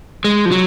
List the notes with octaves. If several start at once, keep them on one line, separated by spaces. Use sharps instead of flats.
G#3
F3
F#3